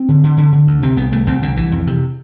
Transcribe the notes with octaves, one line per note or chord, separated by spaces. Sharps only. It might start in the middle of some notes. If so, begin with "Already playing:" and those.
Already playing: C4
D3
D3
D3
D3
D2
C3 C4
C2 B3
C2 A3
C2 C4
C2 D3
C2 E3
F2
C3